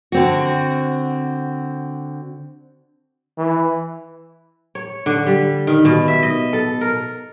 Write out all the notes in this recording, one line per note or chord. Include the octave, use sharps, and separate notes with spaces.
D3 C4 F#4
E3
C#5
D3
G3
D#3
B2
E5
D#5
A4
A#4